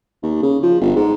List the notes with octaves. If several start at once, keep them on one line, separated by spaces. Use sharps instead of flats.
D#2
C#3
F3
G1
G#2